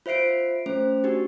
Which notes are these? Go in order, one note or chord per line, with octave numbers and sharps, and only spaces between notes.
F4 C5 E5 C7 D7
A3 C#4 C5
D4 F#4 G4